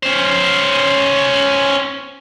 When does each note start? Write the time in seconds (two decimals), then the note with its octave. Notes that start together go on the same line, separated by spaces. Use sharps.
0.03 C#4 C5